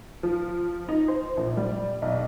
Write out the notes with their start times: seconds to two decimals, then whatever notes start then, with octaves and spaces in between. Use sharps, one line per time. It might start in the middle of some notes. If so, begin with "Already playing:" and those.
0.23 F3
0.89 D#4
1.08 C5
1.37 A#1
1.57 G3
2.02 B1